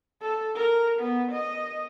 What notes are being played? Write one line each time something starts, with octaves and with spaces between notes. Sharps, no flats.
A4
A#4
B3
D#5